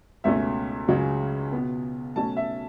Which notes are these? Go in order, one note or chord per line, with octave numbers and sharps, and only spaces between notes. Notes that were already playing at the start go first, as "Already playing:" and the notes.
C#2 B2 A3 C#4 E5
C#2 C#3 F#3 C#4
B2 B3
B2 F#3 A3 C#4 A5
E5